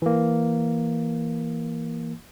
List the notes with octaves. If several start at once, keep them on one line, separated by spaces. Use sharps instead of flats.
E3 A#3